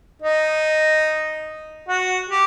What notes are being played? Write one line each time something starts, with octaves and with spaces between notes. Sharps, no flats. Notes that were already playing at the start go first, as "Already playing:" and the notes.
D#4
F#4
G4